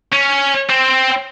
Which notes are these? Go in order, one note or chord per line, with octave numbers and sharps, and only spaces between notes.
C#4
C4